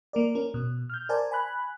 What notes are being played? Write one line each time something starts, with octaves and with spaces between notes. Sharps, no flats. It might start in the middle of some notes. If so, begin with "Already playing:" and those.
A#3 A#4 D5
C#4 A#4
B2
F6 G6
A#4 C5 D5 G#5 A5
G#5 B5 F#6